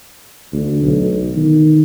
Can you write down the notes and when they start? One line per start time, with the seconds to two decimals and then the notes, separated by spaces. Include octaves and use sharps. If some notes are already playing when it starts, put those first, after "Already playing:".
0.52 D2
0.83 B1
1.37 D#3